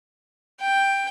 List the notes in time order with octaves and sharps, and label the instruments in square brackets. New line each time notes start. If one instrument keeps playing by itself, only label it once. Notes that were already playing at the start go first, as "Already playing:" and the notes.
[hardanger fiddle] G5